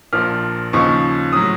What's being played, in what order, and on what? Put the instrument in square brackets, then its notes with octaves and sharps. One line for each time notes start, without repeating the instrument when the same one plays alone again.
[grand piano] A#1 A#2 F3 F6
D#2 C#3 F3 C#6
A2 F#3 D#6